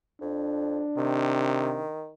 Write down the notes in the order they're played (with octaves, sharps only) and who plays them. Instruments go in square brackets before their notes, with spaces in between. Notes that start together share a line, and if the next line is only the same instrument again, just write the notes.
[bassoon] F2 [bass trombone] D4
[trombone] C3 [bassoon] D#3